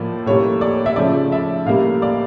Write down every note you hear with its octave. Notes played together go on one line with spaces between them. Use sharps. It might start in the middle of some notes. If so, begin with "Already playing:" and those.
Already playing: A2 F3 A#3 D5
A2 G3 A#3 C#5
D5
E5
C#3 F3 A3 D5
E5
A2 G3 A#3 F5
D5